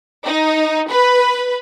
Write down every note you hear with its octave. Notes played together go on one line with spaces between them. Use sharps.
D#4
B4